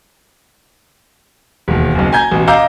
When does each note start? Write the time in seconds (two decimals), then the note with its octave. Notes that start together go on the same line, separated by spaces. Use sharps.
1.68 E1 D#2
1.95 F#1 B1
2.12 G#5 A#5 G6 G#6
2.32 A1 B2
2.47 D#5 F5 A#5 D6 E6 G6